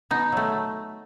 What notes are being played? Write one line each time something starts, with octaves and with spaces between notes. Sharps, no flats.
B2 D#4
F#3 A3